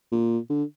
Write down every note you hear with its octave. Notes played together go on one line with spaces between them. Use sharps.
A#2
D3